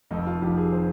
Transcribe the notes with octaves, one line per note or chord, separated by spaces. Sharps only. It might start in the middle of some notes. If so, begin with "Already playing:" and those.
F1 F2 D#3 D#4
F4
F1 F2 D#3 G4
G#4
D#3 C5